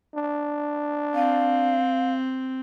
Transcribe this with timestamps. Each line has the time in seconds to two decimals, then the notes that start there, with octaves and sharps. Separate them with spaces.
0.15 D4
1.15 C4 F5